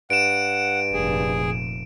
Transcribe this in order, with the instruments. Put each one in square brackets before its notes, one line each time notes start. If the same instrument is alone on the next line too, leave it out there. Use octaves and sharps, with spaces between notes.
[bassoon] G2 [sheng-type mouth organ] F#5 [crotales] D7 E7
[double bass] F1 A#2 [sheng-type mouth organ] G#4